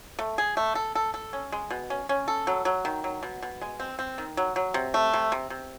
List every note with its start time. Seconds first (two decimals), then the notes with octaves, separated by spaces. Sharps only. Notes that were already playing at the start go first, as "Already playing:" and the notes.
0.19 A3
0.38 G#4
0.57 A3
0.75 A4
0.95 A4
1.14 A4
1.33 C#4
1.52 G#3
1.71 B2
1.90 C#4
2.09 C#4
2.28 A4
2.47 F#3
2.65 F#3
2.85 D#3
3.04 F#3
3.23 B2
3.42 B2
3.61 G#3
3.80 C4
3.99 C4
4.18 D#3
4.37 F#3
4.56 F#3
4.74 C3
4.94 A3
5.13 C3
5.32 C3
5.50 C3